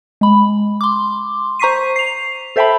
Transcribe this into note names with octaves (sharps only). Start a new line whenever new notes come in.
G#3 B5
C6 D6
C5 A#5 C#6 B6 C7 D#7
C7 F7
A4 C5 E5 G5 A5 B5